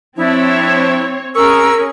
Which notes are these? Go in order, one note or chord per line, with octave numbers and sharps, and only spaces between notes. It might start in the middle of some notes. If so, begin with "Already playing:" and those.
F3 C4 D4 E4 C#5
C#4 G#4 A#4 C#6 E6